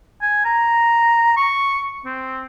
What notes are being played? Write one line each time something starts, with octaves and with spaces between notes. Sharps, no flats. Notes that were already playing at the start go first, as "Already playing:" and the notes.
G#5
A#5
C#6
C4